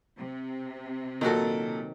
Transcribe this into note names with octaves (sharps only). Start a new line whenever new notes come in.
C3
A#2 D#3 F#3 F#4 A4